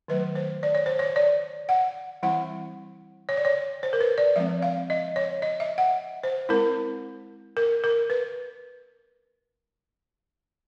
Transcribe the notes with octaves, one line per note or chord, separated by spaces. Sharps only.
D#3 F#3 A3 B4
C5
D5
C#5
C5
C#5
D5
F#5
E3 G3 C4 E4 F#5
C#5
D5
C#5
C5
A#4
B4
D5
F3 G#3 C4 E5
F5
D#5
C#5
D#5
E5
F#5
C5
G#3 C4 E4 A#4
A#4
A#4
B4